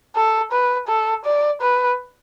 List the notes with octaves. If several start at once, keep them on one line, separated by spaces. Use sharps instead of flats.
A4
B4
A4
D5
B4